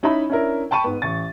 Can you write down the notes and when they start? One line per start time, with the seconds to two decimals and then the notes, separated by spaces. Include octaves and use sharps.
0.03 C#4 D#4 E4 E5 B5
0.30 C#4 D4 E4 A#4
0.71 G5 A5 B5 C#6 D#7
0.84 G#2 B3
1.02 A1 C#6 A6